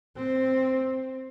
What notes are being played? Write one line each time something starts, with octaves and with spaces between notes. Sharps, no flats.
C4